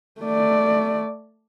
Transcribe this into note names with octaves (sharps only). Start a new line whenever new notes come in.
A3 D5